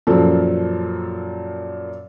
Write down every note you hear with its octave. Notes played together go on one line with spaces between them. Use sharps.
F#2 A#2 F3 A4